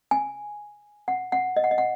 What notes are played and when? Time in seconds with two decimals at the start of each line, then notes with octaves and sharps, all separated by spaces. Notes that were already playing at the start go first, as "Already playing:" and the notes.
0.11 G#5
1.08 F#5
1.32 F#5
1.56 D#5
1.64 F#5
1.71 D#5
1.78 F#5